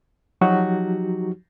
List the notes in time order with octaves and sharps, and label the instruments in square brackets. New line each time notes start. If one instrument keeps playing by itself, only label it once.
[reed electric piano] F3 F#3 D#4 F#4 G4